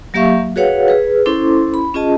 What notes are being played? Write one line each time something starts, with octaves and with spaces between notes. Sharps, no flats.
F#3 A#3 G4 E5 F5 C#6
F#4 G#4 B4 C#5 F5 F#5
G#4 B4
C#4 E4 A4 C5 C6 D6
B5
C#4 F4 G#4 D#5 A5